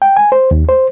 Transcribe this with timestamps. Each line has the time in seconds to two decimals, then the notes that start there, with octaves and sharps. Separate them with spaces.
0.02 G5
0.17 G#5
0.32 C5
0.51 D#2
0.69 C5